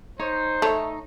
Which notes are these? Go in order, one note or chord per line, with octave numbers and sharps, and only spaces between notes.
D#4 C5 C#5
A3 C#5 E5